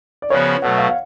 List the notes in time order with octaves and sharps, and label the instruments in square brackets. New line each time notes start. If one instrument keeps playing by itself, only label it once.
[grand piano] D5
[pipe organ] C#3 F3 B3 F#4 [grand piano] C#5
[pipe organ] B2 F#3 A3 [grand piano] F#5
[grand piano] F5
F5